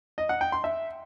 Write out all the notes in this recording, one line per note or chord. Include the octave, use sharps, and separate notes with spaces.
D#5
F#5
G5
C6
E5